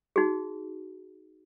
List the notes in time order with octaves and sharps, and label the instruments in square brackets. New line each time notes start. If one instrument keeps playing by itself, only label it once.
[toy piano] D#4 F#4 G#4